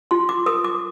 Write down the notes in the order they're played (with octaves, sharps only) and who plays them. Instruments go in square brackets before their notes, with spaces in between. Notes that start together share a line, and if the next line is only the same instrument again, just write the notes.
[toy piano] F4 C6
D6
A#4 D#6
D6